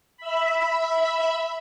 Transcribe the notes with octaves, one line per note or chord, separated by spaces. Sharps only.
E5 B5